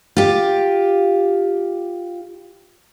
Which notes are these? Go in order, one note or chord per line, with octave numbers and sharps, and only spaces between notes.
F4 G4